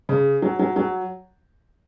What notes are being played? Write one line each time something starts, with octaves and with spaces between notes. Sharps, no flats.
C#3
F#3
F#3
F#3